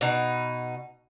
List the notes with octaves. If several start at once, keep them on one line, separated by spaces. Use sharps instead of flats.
B2 D#4